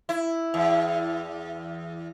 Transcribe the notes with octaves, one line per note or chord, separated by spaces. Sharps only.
E4
E2